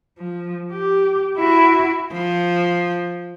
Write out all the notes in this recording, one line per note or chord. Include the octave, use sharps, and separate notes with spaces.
F3
G4
E4 F#4
F3